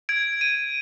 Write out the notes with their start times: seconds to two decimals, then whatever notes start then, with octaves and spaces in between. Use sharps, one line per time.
0.09 G#6 D7
0.41 D#7